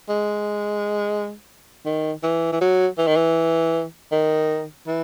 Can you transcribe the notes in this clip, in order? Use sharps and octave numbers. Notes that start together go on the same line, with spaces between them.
G#3
D#3
E3
E3
F#3
E3
D#3
E3
D#3
E3